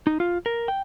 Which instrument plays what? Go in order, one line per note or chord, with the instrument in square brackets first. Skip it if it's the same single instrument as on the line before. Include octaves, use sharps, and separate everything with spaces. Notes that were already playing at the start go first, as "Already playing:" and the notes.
[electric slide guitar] D#4
F4
A#4
G5